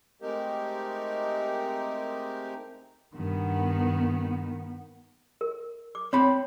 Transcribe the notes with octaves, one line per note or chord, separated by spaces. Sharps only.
G#3 A3 C4 D#4 G4 A#4
G2 D#3 B3
A#4
D6
C4 C#5 B5